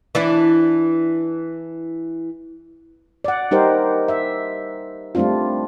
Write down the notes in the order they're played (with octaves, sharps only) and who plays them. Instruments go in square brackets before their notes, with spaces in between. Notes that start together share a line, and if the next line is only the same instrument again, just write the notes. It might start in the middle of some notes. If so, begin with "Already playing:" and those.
[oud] E3 D4 E4
[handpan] D5 F#5
G3 D#4 G4 A#4 C5
E5
G3 A3 C4 D4 F4